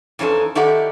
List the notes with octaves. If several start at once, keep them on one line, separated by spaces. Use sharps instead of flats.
F2 E3 C#4 D#4 A4
D#3 E4 G4 A4 D5 F#5